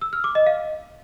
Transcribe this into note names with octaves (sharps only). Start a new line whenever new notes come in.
E6
F6
D6
D#5
F5